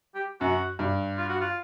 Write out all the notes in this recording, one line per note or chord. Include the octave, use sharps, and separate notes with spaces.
G4
F#2 F#4
G2
F4
F#4
F4